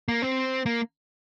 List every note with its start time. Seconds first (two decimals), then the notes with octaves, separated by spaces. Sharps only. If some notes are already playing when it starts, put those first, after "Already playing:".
0.08 A#3
0.22 C4
0.66 A#3